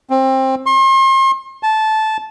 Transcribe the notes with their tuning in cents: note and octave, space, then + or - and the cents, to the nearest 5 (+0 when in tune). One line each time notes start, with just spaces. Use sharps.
C4 +20
C6 +40
A5 -15